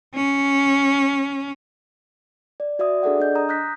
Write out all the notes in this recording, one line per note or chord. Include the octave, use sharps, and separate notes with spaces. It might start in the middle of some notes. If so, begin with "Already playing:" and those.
C#4
D5
F#4 D5 E5 D#6
D4 G#4 A4 D5 F#5
D4 D#5 G6
A#5 D#6
D#6 F#6 G6 A#6 B6